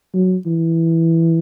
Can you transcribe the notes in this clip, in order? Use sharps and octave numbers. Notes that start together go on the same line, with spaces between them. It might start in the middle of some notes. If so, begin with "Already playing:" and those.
F#3
E3